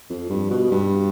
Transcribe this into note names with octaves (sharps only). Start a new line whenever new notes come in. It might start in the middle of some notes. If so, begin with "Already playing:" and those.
F2
G2
B2
G2